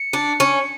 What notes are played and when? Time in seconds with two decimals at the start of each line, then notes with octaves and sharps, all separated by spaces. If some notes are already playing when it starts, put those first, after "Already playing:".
Already playing: C#7
0.13 D4
0.40 C#4